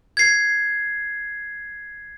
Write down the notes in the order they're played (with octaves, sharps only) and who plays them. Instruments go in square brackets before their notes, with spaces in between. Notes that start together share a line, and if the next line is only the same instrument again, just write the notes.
[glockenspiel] G#6 C7